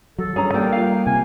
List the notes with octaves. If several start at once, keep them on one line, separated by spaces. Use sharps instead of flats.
F#3 A4
G2 C#4 G#4 A#5
G3 A#3 D4 G5
F4 F5
C3 G#5